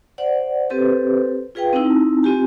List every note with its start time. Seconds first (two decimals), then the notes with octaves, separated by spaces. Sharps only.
0.18 C5 D5 F#5
0.70 C4 G4 A4 B4 C5
1.55 F4 G#4 B4 F5 G5
1.73 C4 D#4 E4
2.23 C4 F4 G4 G#5